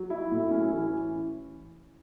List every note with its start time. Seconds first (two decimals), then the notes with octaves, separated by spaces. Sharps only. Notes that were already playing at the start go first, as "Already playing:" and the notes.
Already playing: F#3
0.10 E4
0.31 A2
0.51 C#4
0.73 E3